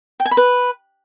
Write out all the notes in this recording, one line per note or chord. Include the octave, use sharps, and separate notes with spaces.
G5
G#5
B5
B4